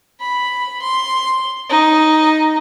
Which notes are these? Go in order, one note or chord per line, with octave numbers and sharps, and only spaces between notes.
B5
C6
D#4